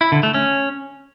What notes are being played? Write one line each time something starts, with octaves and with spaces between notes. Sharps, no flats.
E4
D3
A3
C#4